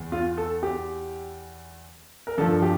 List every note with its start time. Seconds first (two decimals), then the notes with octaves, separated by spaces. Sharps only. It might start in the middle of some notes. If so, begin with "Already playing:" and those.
Already playing: E2 E3
0.12 F4
0.38 A4
0.63 G4
2.27 A#4
2.38 G2 A4
2.41 F3
2.62 G4